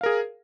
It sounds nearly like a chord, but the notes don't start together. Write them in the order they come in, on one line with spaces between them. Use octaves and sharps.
F5 A#4 G#4